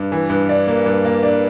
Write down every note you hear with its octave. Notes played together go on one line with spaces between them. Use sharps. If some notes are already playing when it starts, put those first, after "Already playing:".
Already playing: G2
E3
G2
D4
A#3
G2
A#3
D4